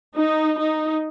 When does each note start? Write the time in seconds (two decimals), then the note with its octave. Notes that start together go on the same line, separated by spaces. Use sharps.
0.14 D#4
0.59 D#4